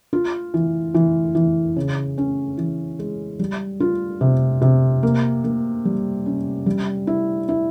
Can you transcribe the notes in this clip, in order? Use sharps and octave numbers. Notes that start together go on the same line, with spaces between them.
F4
E3
E3
E3
C#3
C#4
E3
G#3
G3
F4
C3
C3
A#3
A#3
G3
C#4
G3
E4
E4